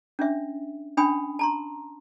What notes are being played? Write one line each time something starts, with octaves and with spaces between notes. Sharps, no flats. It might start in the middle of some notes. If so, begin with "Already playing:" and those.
C#4 D4 E5
C#4 D4 G5 G#5 B5 D#6
A5 A#5 C6